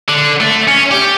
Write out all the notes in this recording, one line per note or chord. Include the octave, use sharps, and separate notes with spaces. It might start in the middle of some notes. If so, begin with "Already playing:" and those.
D3
A3
C#4
G4